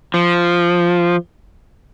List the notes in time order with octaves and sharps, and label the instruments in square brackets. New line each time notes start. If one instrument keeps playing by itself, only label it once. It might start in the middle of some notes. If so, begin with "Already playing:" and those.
[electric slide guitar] F3